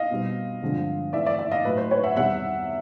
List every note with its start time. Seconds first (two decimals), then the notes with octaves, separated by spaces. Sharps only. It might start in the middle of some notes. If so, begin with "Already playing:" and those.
Already playing: D#5 F5
0.11 B2 G3 C4
0.62 G2 D3 F3 G#3 C4
1.13 G#2 E3 A3 C4 D5 E5
1.26 D5 E5
1.39 D5 E5
1.52 D#5 F5
1.65 A2 F#3 A3 B4
1.77 C5
1.91 B4 C#5
2.04 E5 F#5
2.16 E2 C3 D#3 G3 E5 F#5